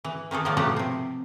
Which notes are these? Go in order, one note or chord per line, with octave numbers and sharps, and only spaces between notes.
E3
D#3 E3 G#4 A4
A2 D#3 F3 D5
B2 F3 F#3 A3 G4 F#5
C3 C4